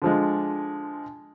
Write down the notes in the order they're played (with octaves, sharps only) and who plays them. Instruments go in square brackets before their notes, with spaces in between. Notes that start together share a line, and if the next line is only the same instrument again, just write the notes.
[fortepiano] D3 F3 G#3